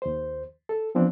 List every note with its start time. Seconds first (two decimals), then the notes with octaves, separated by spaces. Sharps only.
0.02 D#2 C5
0.69 A4
0.95 E3 F3 B3 C4 D4